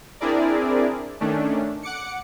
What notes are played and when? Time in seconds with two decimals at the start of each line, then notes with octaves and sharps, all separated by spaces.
0.20 C4 D4 E4 G#4 A#4 D5
1.20 D#3 A3 C#4 D4
1.83 F#5 D6 C#7